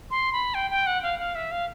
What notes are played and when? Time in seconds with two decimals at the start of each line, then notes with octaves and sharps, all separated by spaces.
0.11 C6
0.33 B5
0.54 G5
0.71 G5
0.87 F#5
1.03 F5
1.19 F5
1.35 E5
1.51 F5